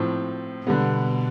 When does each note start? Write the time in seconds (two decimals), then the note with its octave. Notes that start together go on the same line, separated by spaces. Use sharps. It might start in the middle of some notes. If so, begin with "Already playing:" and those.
Already playing: A2 F3 C4
0.66 B2 D3 G3 B3